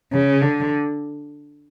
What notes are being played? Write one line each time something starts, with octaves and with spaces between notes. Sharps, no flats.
C#3
D3